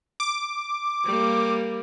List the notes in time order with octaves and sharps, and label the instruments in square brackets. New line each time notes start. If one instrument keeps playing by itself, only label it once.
[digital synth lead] D6
[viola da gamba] G3 A#3